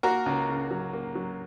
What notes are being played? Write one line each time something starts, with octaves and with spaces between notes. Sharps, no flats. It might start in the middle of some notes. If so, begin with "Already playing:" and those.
A#3 F#4 A#4
C#2
C#3
F#3
A#3
F#3